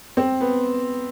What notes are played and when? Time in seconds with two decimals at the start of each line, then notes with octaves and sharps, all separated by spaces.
0.17 C4
0.41 B3